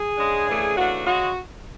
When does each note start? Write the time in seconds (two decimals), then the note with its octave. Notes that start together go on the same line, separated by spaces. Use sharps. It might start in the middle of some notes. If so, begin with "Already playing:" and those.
Already playing: G#4
0.17 C#3 G#3 D4
0.46 C#3 E3 A3 D4
0.75 C#3 E3 A3 D4 F#4
1.05 C#3 G#3 F#4